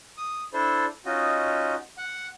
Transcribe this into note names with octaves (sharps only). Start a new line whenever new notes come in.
D#6
D4 E4 A4 C5
C#4 D#4 F4 F#4 D#5
F#5